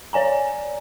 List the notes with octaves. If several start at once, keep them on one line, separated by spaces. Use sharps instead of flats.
C#5 D5 G#5 A#5